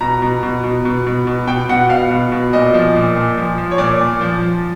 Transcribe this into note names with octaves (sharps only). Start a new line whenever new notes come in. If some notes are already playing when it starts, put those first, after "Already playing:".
B2 A#5
B2
B2
B2
B2
B2
B2
B2 G5
B2 F#5
B2 F5
B2
B2
A#2 D#5
F3
A#2
A#2
F3
F3
C#5
A#2 D5
A#2
F3
F3